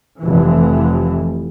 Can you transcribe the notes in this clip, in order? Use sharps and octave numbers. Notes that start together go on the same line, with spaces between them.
F1 E3